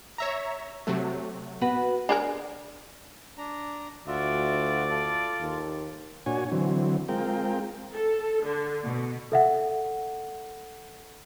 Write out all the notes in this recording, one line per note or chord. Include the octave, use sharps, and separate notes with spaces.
C#5 E5 A#5
C3 F#3 A3
B3 F#4 B4
D4 G#4 A#4
D4 A#5
D2 F4 F#4 D5 E5
F4 A4
D#2
A#2 D4 F#4 C#5 G#5
D3 E3 F#3 C4
G#3 C4 F4 A#4 G5
A4
D3
B2
A4 E5 F#5